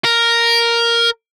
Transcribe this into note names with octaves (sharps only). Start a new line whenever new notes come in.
A#4